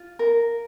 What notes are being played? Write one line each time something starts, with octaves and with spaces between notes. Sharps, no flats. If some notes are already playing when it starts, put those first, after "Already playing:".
Already playing: F4
A#4